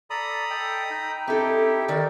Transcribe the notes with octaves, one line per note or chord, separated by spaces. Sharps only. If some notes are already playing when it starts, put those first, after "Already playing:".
A4 D5 A#5 B5 D#6
A4 D#5 G5
D#4 G5
C4 E4 G4 A4
D#3 A#4 D5